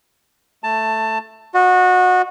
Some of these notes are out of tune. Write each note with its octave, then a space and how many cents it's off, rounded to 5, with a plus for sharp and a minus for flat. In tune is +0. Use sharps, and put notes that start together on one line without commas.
A3 +0 A5 +15
F#4 -20 D#5 -35